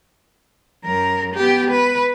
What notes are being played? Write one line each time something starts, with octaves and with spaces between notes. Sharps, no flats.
F#2 A#4
B3 G4
B4